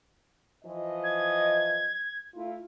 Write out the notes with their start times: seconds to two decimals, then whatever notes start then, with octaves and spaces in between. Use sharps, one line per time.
0.64 E3 F3 D#5
1.04 G#6
2.35 A3 E4 F4